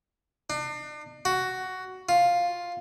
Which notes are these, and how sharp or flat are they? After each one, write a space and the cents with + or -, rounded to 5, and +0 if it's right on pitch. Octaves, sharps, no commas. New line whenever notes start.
D4 +40
F#4 +10
F4 +5